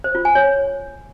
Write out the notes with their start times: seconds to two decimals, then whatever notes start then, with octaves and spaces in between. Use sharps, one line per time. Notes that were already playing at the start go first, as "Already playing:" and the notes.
0.04 C5
0.15 F4
0.25 G#5
0.35 C#5